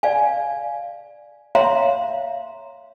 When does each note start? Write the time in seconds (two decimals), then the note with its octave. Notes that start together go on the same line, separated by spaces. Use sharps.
0.03 D5 F5 G#5
1.55 C#5 E5 F5 A#5 C6